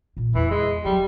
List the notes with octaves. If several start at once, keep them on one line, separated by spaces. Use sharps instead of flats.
A#2 F4
E2 E3
G#3
F#3 G3